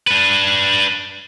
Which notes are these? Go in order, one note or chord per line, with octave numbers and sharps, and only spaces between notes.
D4 B4